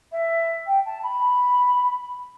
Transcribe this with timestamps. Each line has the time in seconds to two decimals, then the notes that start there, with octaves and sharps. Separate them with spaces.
0.12 E5
0.66 G5
0.85 A5
1.03 B5